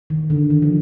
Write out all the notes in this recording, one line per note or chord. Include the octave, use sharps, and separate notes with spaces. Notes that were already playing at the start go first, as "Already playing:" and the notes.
D#3
D3
D#3
F3